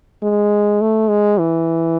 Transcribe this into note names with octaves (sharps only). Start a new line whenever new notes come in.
G#3
A3
G#3
E3